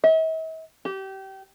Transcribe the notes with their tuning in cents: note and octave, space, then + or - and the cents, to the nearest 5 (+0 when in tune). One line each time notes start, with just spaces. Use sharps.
E5 -45
G4 -25